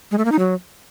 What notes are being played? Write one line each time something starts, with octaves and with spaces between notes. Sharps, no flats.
G#3
A3
A#3
D#4
F#3